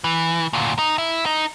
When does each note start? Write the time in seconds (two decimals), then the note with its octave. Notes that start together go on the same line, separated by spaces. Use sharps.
0.04 E3
0.53 D2 A#2
0.79 D#4
0.98 E4
1.26 D#4